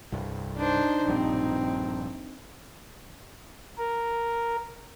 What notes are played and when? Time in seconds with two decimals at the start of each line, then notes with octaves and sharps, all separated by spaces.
0.12 C2 G2
0.57 D4 D#4 C5
1.08 A#1 G2 C4
3.78 A#4